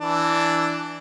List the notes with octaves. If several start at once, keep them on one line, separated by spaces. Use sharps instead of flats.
E3 D4